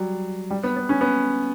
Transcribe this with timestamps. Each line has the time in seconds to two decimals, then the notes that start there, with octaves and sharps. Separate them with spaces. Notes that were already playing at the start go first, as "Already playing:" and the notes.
Already playing: F#3 G3
0.50 G3
0.63 B3
0.76 B3
0.89 C#4
1.01 B3